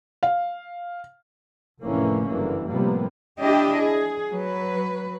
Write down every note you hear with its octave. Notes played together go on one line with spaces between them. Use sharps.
F5
F1 A2 D3 E3 A#3 C#4
F#1 G2 D3 E3 A#3
A2 C3 F3 G3 A#3 B3
D4 E4 G4 D#5
G#4
F#3 B4